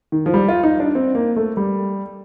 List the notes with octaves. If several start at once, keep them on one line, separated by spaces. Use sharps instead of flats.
D#3
F3
G3
F4
D#4
D4
C4
A#3
A3
G3